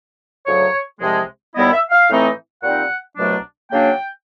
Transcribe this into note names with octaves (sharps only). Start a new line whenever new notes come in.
D2 C#3 F#3 C#5
C2 C3 F3 G#3
D#2 D#3 G3 B3 E4 D#5
E5
F5
A2 E3 A3 C4 D#4
A#2 G3 C4 D#4 F#5
C2 B2 F#3 A3 D4
C#3 F#3 A#3 D4 G5